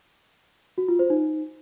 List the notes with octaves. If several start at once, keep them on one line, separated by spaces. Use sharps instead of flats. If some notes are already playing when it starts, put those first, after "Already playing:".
F#4
F4
C5
D#4